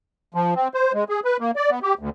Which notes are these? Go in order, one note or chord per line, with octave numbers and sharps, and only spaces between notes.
F3
C4
C5
G#3
G#4
B4
A#3
D5
B3
G4
D2